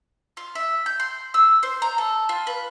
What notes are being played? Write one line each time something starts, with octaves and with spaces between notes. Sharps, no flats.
F4
E5
G6
C6
E6
C5
A#5
A4
F4
B4